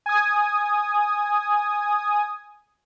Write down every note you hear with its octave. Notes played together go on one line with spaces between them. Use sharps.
G#5 D#6